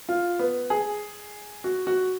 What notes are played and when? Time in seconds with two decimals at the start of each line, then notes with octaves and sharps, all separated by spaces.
0.09 F4
0.39 B3
0.70 G#4
1.64 F#4
1.87 F#4